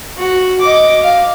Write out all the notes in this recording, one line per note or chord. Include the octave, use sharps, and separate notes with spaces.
F#4
D#5 D6
F5